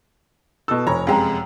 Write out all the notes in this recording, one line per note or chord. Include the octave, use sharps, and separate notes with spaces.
B2 A4 E6
F1 C#5 A#5 B5
F#2 C3 G#3 F5 G5 A#5